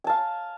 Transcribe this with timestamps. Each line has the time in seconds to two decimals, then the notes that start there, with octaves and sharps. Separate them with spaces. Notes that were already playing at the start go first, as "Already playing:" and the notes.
0.04 G#5
0.07 A5
0.09 F5